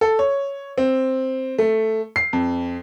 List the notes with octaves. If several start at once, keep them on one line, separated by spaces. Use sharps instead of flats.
A4
C#5
C4
A3
C7
F2